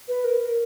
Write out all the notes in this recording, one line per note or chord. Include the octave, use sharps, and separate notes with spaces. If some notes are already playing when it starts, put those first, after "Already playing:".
B4
A#4
A#4